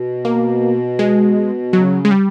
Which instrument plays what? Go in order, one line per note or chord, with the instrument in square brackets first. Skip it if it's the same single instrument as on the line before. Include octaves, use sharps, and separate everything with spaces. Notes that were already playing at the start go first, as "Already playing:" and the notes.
Already playing: [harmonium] B2
[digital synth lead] A#3
G#3
[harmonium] C#3 [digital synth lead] F#3
[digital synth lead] G#3
G3